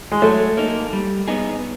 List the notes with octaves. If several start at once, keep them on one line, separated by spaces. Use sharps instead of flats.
G#3
F#3 A3
A#3 D#4
G3
B3 D#4 G#4